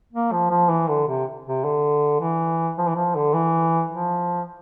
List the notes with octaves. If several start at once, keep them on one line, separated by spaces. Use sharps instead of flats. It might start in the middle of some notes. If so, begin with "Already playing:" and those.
A#3
F3
F3
E3
D3
C3
C3
D3
E3
F3
E3
F3
D3
E3
F3